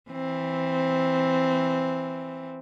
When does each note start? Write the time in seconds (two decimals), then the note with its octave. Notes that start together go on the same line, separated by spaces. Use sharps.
0.11 E3 C4